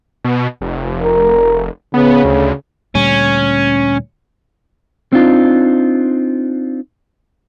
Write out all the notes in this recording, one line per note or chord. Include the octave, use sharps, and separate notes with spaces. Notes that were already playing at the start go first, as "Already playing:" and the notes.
B2
F1
A#4
C#3 B3
D2
D2 A#2 G3 C#4
C4 D4 D#4 F4